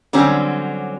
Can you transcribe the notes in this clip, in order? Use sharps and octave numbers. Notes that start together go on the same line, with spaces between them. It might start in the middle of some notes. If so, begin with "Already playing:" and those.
D3 F#3 G3 C4 C#4